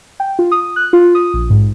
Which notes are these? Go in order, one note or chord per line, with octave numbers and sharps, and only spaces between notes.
G5
F4
D#6
F#6
F4
D#6
A#1
G#2